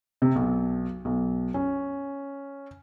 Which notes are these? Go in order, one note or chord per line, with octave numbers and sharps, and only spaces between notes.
C3
B1
B1
C#4